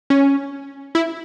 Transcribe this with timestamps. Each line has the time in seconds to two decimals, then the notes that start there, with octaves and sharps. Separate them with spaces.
0.10 C#4
0.95 E4